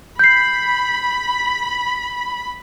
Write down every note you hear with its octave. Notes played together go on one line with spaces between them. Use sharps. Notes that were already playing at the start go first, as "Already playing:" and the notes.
B5 G6 C7